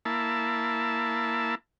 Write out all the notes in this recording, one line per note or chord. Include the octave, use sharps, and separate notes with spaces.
A#3 E4 A5